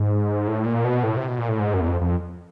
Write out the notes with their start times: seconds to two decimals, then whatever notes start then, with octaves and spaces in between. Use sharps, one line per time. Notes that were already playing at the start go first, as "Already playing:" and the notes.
Already playing: G#2
0.48 A2
0.65 A#2
0.85 B2
1.03 A2
1.17 C3
1.28 B2
1.38 A#2
1.49 A2
1.59 G#2
1.74 F#2
1.81 E2
1.88 F2
2.01 F2